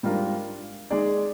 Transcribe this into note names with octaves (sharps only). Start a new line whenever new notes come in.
G#2 G3 D4 F4 A#4
G#3 D#4 G#4 D5